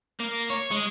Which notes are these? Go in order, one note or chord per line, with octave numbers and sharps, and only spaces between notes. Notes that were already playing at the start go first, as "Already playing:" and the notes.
A#3
C#5
G#3